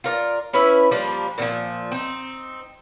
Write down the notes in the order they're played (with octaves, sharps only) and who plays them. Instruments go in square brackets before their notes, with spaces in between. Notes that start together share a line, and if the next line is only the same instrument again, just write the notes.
[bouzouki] F4 A#4 D5
C#4 E4 B4 E5
F3 G3 A#3 D4
A#2 D3 F3
C4 D#4